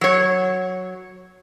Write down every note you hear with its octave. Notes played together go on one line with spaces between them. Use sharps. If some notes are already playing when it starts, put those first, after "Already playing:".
F#3 C#5